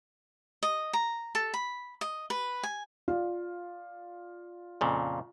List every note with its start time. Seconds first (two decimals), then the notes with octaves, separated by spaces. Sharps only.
0.63 D#5
0.93 A#5
1.35 A4
1.54 B5
2.01 D#5
2.30 B4
2.63 G#5
3.08 F4 D5 F5
4.81 F2 A#2 C#3